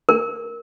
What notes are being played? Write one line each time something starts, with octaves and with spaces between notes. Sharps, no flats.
A#4